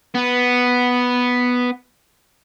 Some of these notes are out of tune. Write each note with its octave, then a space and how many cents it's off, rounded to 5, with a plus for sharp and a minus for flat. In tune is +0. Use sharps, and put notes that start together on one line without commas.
B3 +0